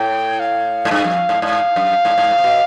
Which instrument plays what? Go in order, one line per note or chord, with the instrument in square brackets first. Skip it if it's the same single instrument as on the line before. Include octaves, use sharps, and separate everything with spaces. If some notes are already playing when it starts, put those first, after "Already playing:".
Already playing: [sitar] A2 [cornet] G5
[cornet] F5
[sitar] G#2
G2
F2
G#2
[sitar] G#2 [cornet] F5
[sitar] F#2
G#2
G#2
A2
C3
B2